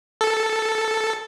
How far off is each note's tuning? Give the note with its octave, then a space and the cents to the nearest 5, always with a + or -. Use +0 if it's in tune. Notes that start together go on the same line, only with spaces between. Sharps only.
A4 +0